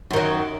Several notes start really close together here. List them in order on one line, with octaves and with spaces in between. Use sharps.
F#2 D#3 F#3